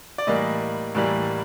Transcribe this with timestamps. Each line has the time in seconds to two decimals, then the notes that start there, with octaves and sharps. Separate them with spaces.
0.18 D5
0.27 A2 E3 G3 A#3 D#5
0.95 A2 E3 G3 A#3